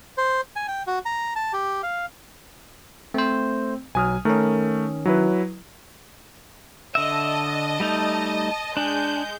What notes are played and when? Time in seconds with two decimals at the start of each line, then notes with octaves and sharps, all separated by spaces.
0.18 C5
0.56 G#5
0.68 G5
0.87 F#4
1.05 A#5
1.36 A5
1.53 G4
1.83 F5
3.14 A3 C4 C5
3.95 B1 F#3 G#5 D#6 F6
4.25 D#3 A3 C#4 A#4
5.05 F#3 E4 B4
6.95 D3 D#5 E5 A5
7.80 G3 A3 D#4
8.77 G#3 D4 G6